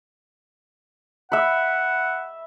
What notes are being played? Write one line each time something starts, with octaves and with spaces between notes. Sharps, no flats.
E5 F#5 B5